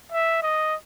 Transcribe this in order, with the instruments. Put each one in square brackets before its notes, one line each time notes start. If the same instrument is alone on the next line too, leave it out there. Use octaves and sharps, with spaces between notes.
[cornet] E5
D#5